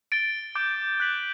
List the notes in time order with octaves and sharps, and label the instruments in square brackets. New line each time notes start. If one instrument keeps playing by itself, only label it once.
[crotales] A6 D7 G7
D6 G6 D7 G7
F#6 B6 F#7